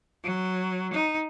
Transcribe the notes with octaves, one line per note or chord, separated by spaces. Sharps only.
F#3
D#4